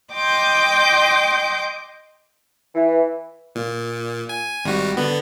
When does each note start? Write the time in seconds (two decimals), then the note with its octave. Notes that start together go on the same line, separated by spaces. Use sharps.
0.14 D#5 G5 C6 D6 G6
2.74 E3
3.55 A#2
4.29 G#5
4.65 G#1 G3 F#4
4.97 D3 B3